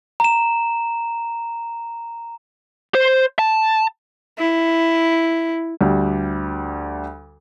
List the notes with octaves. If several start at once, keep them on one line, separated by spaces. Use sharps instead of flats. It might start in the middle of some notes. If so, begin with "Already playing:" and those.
A#5 E7
C5
A5
E4
D2 G3